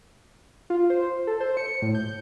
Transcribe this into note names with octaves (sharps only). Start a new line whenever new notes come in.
F4
C5
A4
C5
C#7
A2
G6